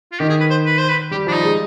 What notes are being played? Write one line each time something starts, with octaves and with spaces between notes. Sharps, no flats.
F4
D#3 G4
G#4
B4
C5
B4
C5
B4
G3 G4
F3 D4
D#4
G#3